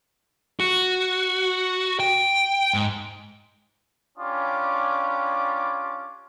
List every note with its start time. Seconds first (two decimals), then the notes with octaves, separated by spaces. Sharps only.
0.60 F#4
2.00 G5
2.74 G#2
4.18 C#4 D4 F4 G4 B5 D6